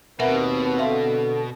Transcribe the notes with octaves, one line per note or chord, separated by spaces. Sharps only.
D#2 B2 C4 A#4 B4 E5 F#5
D3 E5 F5 C6